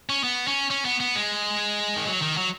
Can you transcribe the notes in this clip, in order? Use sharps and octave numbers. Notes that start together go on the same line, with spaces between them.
C#4
B3
C#4
C#4
B3
B3
G#3
D#3
F#3
D#3
F#3